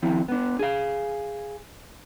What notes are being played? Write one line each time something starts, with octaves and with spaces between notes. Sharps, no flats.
D#2 F3 C4 E4
B3 D4
G#4 F5